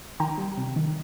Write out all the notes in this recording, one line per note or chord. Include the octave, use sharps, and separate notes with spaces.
D#3 G5 A#5
G3
C3
D#3